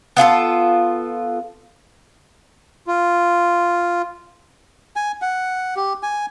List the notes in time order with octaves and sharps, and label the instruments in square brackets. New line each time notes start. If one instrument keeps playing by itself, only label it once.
[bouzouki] B3 F4 G#4 A4
[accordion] F4
[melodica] G#5
F#5
G4
G#5